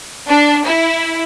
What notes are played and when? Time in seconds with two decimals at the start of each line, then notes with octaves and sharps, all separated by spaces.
0.29 D4
0.66 E4